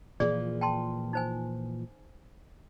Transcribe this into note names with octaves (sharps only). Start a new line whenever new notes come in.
A#2 E3 F3 G#4 D5
G5 A5 C6
D#4 C5 G#5